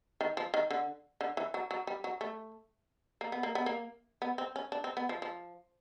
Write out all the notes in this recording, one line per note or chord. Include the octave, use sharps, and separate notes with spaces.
D#3
F3
D#3
D3
D3
E3
F#3
F#3
G3
F#3
A3
A#3
B3
A#3
B3
A#3
B3
C4
C#4
D4
C4
B3
F3
F3